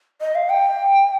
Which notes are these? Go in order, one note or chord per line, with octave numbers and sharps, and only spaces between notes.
D#5
F5
G5